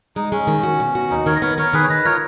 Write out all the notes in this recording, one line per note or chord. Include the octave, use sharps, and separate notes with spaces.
G#3 D#4
G#3 C#4
D#3
F#4
B2
F#4
D#2 D#4
D#3 A#4 C#5
D#5
B3 A#4 C#5
B3 A#4 C#5
D#3 G#4 B4
C#5
D#3 B4 D#5
F4 A#4 C#5